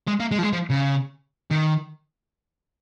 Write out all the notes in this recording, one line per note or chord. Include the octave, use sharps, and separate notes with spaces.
G#3
A#3
G#3
F3
G#3
F3
C#3
D#3